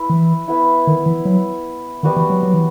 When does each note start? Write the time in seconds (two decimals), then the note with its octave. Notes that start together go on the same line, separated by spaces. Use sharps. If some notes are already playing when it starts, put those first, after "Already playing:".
Already playing: E4 B4
0.10 E3
0.48 B3 E4 B4
0.87 D#3
1.06 E3
1.25 F#3
2.03 D#3 G3 B3 F#4
2.16 E3
2.30 F#3
2.43 F#3
2.54 E3